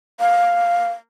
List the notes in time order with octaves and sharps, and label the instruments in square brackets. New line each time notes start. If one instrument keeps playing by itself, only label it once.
[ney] F5